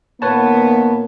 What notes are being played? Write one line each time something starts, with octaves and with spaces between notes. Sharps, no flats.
A#2 D#3 A#3 B3 B4 C#5 A5